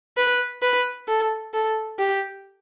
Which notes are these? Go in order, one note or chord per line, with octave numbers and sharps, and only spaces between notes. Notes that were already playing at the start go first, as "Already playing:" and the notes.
B4
B4
A4
A4
G4